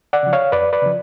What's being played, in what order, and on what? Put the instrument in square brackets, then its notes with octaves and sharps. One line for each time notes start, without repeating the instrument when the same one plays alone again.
[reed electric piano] D5 F#5
C#3 F3
C#5 F5
F2 B4 D5
B4 D5
C#3 F3